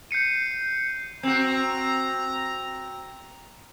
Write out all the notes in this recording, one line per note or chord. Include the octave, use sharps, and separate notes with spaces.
G6 C7 C#7 D#7
C4 F#4 A#5